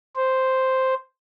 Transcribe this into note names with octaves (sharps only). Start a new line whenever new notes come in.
C5